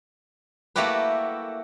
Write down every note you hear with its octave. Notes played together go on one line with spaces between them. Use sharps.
A3 A#3 E4 F#4 G4 B4